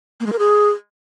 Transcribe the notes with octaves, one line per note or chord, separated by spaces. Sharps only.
A#3
G#3
A#4
G#4